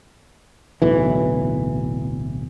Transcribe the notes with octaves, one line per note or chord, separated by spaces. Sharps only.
D1 B1 E3